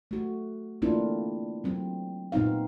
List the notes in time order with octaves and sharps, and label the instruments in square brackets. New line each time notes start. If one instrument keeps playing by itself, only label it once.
[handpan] A3 F#4
A3 A#3 C4 D4 E4 F4
F#3 C4
A#2 B3 C4 D#4 F5